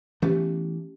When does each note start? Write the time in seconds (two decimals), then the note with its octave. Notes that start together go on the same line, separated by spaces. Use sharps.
0.22 E3 A3 B3 C#4 G4